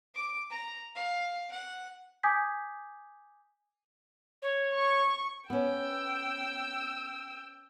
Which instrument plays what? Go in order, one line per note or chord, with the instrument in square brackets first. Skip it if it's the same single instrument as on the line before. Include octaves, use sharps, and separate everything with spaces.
[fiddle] D6
A#5
F5
F#5
[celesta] G#5 D6 D#6 G6 G#6 B6
[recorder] C#5
[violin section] C#6
[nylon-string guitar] B3 C#4 [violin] G5 E6